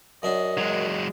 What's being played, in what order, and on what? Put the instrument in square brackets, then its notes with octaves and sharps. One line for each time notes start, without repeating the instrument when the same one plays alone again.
[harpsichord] F#2 D4 [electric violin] D#5
[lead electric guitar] F#3 G#3